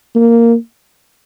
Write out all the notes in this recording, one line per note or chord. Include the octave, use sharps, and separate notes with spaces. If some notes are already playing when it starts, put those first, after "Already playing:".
A#3